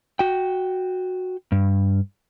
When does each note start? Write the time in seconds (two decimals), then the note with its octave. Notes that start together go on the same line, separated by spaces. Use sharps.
0.19 F#4 G5
1.52 G2